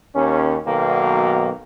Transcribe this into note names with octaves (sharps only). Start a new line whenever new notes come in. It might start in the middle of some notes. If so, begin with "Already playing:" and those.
D#2 C#4
B1 B2 D#3 F#3 A#3